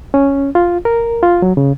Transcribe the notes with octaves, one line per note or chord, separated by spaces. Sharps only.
C#4
F4
A#4
F4
F#3
C#3